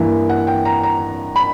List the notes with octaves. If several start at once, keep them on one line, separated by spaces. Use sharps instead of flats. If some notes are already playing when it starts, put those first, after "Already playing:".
Already playing: G2 E3 A#3 E4
F#5
G5
A#5
A#5
B5